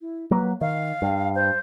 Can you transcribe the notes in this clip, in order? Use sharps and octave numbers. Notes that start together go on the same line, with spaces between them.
E4
F#3 A#3 B4
D#3 F5
G2
C5